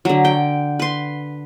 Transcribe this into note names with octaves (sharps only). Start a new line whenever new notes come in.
D3 F#3
G5
B4 C6